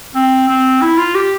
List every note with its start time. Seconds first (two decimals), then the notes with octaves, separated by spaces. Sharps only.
0.14 C4
0.48 C4
0.81 E4
0.98 F4
1.15 G4